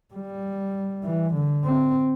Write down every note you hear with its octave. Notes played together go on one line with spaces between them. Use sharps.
G3
E3
D3
C4